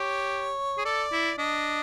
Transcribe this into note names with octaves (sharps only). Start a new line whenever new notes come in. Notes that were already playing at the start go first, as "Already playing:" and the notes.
Already playing: G4 C#5
G#4
A4 D5
E4
D4 D#5